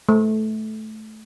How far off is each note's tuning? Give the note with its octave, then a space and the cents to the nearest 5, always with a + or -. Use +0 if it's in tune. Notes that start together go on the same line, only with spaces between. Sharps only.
A3 -15